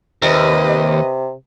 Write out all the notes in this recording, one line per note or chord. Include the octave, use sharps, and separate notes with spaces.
D#2 C3 B4 D#5